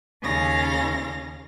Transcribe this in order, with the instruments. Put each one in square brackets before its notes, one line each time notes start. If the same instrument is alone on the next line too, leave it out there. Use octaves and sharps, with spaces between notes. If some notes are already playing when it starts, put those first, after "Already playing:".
[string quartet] D#2 C#3 C#4 F5 A#6